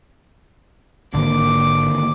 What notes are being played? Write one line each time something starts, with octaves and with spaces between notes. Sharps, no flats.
G#1 D3 A#3 D6